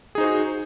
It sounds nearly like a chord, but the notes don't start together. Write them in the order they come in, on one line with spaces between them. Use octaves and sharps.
G#4 D#4 C5 F#4